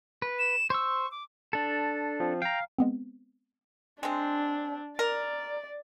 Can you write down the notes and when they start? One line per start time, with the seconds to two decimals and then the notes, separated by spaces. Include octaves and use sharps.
0.22 B4
0.39 E7
0.70 C5 C#6 E6
1.11 D6
1.53 D4 A4
2.20 F3 C4
2.42 F5 G5 A#5
2.78 G#3 B3 C4
4.03 G#3 C4 D4
4.99 A#4 D5